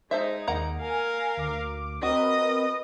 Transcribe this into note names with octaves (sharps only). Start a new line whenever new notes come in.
G#3 D#4 A4 C5 E5
D#2 A#3 F#5 A#5
A#4 F5 G#5
D2 D6
C4 F#4 A#4 B4 D#5